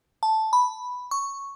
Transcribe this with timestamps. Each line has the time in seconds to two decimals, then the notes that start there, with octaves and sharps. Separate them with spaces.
0.23 A5
0.53 B5
1.11 C#6